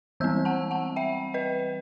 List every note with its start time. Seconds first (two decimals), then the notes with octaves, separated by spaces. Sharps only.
0.20 E3 G3 C4 E6 G6
0.45 F#5 A5
0.71 F#5 A5
0.96 E5 G5
1.34 B4 D#5